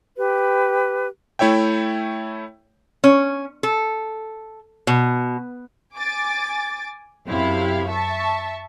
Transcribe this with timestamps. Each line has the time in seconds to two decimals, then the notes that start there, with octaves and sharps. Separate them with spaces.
0.16 G4 B4
1.39 A3 E4 C#5 E5 G5
3.04 C#4
3.63 A4
4.87 B2
5.96 G#5 D6 A6
7.29 F#2 C3 E4 F5
7.88 E5 A5 C#6